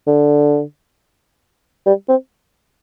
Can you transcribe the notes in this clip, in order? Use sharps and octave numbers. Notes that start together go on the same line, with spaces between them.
D3
G3
C4